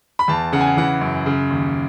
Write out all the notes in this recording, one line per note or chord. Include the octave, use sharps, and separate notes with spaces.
B5
E2 A5
C#3 F#5
G#5
F#5
E3 F#5
F#2
C#3
D#2